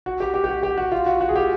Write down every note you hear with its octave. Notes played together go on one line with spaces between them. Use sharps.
F#4
G4
G4
G4
F#4
G4
F#4
F4
F#4
F#4
G#4
G4